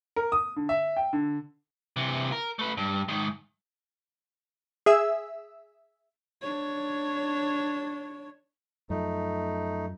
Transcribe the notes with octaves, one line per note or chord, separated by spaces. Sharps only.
A#4
D#6
D3
E5
G5
D3
C3 E3
A#4
A3 B4
G2
G#2 D#3
G#4 E5 E6
D4 C#5
F#2 F3 A3 D#4